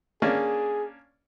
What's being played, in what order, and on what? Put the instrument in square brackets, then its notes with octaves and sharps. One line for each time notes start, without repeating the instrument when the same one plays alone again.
[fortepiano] A#3 C#4 D4 [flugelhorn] G#4